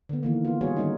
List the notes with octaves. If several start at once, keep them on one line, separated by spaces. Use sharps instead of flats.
D3 B3
D#3 E3 A#3
B3 F4
G3 B3 F4 F#4 G#4 C#5
D#3 G3 G#3 C#4 D#4